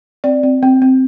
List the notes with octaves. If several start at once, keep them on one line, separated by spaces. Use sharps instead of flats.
C4 D5
C4
C4
C4